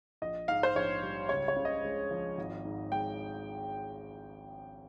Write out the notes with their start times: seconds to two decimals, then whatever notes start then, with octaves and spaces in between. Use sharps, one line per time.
0.22 A#1 D#5
0.48 G#2 F5
0.63 C5
0.75 A#1 C#5
1.03 G3
1.29 C#2 C#5
1.48 C#5
1.56 C#3
1.65 D#5
1.84 G#3
2.11 F3
2.38 G#1
2.65 G#2
2.91 G#3 G5